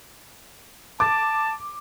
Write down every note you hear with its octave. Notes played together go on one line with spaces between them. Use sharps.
A5 D6